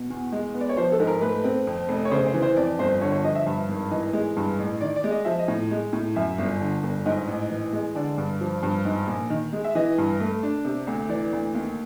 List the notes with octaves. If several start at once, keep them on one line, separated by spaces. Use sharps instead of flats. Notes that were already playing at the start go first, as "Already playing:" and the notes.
Already playing: B2
E2
G#3
B3
D5
C#5
F3 C5
A4
G#2
A#4
A3 B4
C4
F2
F1
C#5
C#3 C5
C5
E3
C5
F2 D5
G1 C5
D3 C#5
C#5
F3 D#5
E5
G2
G#1
E3 D#5
G#3
G2
A1
D#3 D5
D5
G#3
D#5
F3 E5
D#5
A2
G#3
A2
F#2 E5
G1
D3
G1
G#2 D#5
A1
E3
G#3
D3 D5
G2
F3
G2
G#2
A#1
D#3
G#3
E5
E3 D#5
G2
A3
D4
C3
D2
E3 D5
D2
D#2